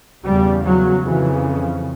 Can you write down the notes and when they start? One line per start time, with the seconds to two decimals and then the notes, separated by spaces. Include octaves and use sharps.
0.23 E2 C#3 G3
0.64 F#3
1.04 F2 C#3 E3